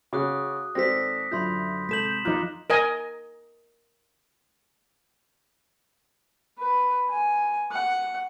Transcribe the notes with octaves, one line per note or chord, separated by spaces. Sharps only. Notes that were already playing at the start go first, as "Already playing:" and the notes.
C#3 F#4 D6 D#6 F#6
G#1 C4 A4 D5 A#6 B6
F#2 D3 F#3 F4 E5 B5 C6 G6
C3 G#3 A4 G6 B6 E7 F#7
F3 D#4 F4 A#5 D6 F#6 G6
A#4 D#5 G#5
B4
G#5
F#5